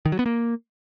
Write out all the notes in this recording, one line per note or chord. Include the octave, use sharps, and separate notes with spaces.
D#3
F#3
B3
A#3